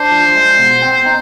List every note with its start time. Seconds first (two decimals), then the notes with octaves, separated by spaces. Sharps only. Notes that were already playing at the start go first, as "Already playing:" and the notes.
Already playing: D4 C5
0.12 F3
0.35 G#3
0.58 B2
0.82 C4
1.06 D#4